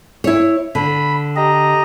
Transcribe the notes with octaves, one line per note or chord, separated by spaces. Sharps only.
E4 C#5
D3 B5
G4 D#5 A#5